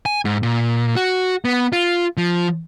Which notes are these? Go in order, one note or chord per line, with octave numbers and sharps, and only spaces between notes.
G#5
G#2
A#2
F#4
B3
F4
F3